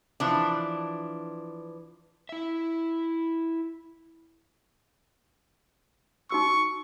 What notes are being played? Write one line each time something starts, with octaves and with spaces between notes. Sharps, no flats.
E3 F3 D4
E4 E5
D#4 F#4 C#6 E6